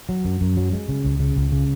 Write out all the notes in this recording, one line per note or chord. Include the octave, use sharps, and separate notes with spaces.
F#3
F#2
F#2
F#3
G#3
C#3
C#2
C#3
C#2
C#3